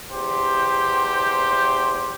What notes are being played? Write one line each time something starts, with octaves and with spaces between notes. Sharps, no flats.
E2 G4 C5